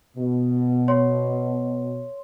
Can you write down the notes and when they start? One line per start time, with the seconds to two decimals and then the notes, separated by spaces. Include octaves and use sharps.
0.16 B2
0.88 C#5 C6